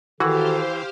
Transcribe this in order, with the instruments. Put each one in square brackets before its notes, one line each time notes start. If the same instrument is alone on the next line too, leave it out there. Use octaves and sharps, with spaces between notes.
[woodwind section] D#3 A4 [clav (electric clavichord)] E3 [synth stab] F#4 [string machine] G4 C5 F5